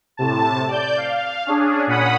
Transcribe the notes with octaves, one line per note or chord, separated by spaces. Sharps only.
A2 C3 A5
D5 G6
F5
C#4 D4 G#4
A#2 C#4 F#5 B5 D#6